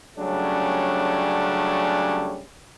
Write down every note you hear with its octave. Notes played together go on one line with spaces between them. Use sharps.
C#3 F#3 G3 A3 C#4 D4